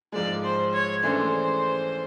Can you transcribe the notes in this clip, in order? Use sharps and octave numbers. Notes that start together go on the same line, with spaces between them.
G#2 F3 G#3 D5
C5
C#5
C#3 E3 A3 D4 C5